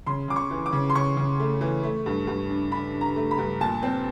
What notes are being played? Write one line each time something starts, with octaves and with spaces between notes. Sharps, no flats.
C#3 C6
C#3 D6
C#6
E3
D6
C#3
C6
C#3 C#6
C#3
A3
E3
A3
G2
G2
D4
D4 B5
D4
A#5
A3
B5
G2
A#2 A5
C4